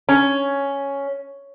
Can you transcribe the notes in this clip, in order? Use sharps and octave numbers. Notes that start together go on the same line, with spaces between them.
C#4